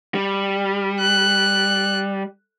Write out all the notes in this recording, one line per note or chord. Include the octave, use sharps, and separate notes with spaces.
G3
F#6